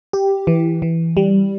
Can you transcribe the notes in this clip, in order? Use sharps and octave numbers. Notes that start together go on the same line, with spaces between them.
G4
E3
E3
G3